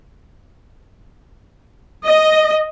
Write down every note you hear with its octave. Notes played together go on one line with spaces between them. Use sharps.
D#5